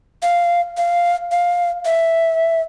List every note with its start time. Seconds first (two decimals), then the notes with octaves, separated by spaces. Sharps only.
0.22 F5
0.77 F5
1.32 F5
1.85 E5